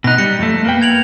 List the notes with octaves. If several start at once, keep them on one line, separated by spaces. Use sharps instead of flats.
B2 D#4 F#6 A#6
G3 C#7
F2 A3
A#3 B3 G5
G#6 F7 F#7